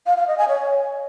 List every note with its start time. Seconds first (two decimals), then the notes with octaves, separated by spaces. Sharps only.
0.06 F5
0.17 F5
0.28 D#5
0.38 G#5
0.49 C#5